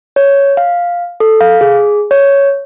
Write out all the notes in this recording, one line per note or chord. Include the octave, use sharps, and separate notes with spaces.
C#5
F5
A4
F5
G#4
C#5